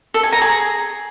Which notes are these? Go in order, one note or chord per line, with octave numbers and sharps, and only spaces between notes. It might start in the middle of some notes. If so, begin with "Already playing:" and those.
A4
G#5
A#5
G#4